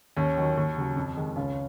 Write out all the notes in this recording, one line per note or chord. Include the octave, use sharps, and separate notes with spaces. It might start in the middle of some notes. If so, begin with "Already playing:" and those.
D#2 C#4
D#3 F#3
D#2
C#3 F#3
F2
D#3 G#3
C#2 C#4 F4